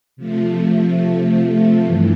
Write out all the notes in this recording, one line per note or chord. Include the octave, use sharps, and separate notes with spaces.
C3 F3 A3
G2 E3